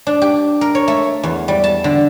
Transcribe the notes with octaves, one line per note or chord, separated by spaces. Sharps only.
D4
G4
A#4
C#5
A3
E2
G3
A5
D3